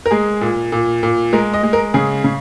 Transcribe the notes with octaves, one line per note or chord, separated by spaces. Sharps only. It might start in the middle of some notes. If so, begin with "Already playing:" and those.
A#4
G#3 G#4
A#2
A#2
A#2
G#3 A#4
D#5
G#3
A#4
C#3 G#4
C#3